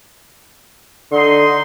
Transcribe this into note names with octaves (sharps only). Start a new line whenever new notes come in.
D3 D#4 C6